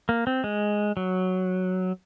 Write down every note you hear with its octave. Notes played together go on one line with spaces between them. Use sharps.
A#3
C4
G#3
F#3